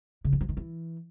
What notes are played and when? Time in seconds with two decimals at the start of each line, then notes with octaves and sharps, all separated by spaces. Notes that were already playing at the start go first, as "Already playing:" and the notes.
0.25 C#3
0.33 E3
0.41 F3
0.49 D#3
0.57 E3